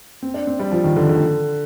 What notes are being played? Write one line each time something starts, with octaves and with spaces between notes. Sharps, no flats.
C4
D4
C4
G3
F3
D#3
D3
D3